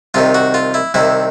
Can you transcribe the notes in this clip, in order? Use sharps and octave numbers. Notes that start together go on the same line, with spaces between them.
C2 C3 D#3 F4
F#4
F4
E4
C2 C3 D#3 E4